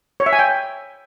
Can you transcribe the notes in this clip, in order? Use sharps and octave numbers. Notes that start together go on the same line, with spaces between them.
C#5
E5
G#5
G5